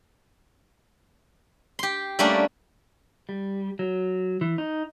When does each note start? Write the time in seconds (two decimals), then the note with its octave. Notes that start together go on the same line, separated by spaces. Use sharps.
1.79 G4 C6
2.19 G3 A3 A#3 C#4 D4 D5
3.29 G3
3.79 F#3
4.41 E3
4.58 D#4